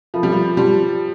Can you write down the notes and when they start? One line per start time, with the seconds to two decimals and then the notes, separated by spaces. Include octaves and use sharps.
0.14 F3 A4 E5 B5
0.23 G3
0.32 F3
0.57 G3 G4 D5 A5 C6